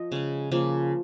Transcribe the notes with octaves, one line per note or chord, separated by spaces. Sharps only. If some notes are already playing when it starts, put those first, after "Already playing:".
Already playing: F3 D#5
C#3 G#3
C#3 F3 A#3